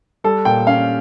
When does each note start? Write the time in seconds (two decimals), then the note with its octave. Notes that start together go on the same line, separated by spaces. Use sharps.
0.24 G3 A4
0.45 A#2 G5
0.67 C#4 F5